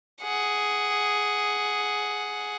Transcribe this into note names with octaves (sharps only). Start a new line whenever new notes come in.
G#4 F#5